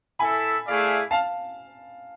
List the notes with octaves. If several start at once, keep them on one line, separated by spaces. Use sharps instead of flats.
E4 A4 E5 G#5 B5
A3 E4 G#4 D5 F5
F5 A5